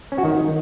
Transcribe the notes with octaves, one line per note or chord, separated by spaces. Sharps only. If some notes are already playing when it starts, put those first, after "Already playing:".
C#4
F#4
D#3